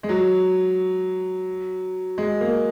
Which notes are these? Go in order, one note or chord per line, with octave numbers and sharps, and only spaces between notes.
G#3
F#3
G#3
A#3